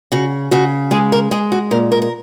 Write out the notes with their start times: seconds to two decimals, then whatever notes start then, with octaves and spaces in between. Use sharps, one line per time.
0.12 C#3 F#4
0.51 C#3 F#4
0.91 G#3 G#4
1.12 A#4
1.31 G#3 G#4
1.52 F#4
1.71 A#2 A#4
1.92 A#4
2.02 A#4